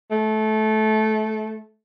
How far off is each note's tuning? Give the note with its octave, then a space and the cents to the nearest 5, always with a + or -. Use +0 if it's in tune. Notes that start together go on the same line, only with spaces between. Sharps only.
A3 -20